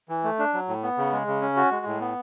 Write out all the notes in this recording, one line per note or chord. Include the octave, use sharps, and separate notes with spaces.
E3
A3
D4
F#3
A2
B3
C#3
G#3
C#3
C#4
F#4
G#3
A2
B3